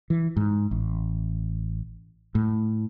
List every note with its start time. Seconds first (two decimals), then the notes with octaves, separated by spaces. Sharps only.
0.10 E3
0.37 G#2
0.71 A1
2.35 A2